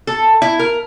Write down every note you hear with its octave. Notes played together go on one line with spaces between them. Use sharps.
A4
E4
A#4